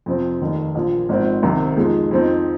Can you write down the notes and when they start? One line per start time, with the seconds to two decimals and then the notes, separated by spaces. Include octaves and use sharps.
0.06 F2 C3 F3 C4
0.41 F1 D#2 D#3
0.75 A#1 A#2 F3
1.09 G#1 G#2 F3 C4 D#4
1.43 C2 C3 D#3 C4
1.77 F2 F3 G#3 D#4
2.11 F2 F3 C4 D#4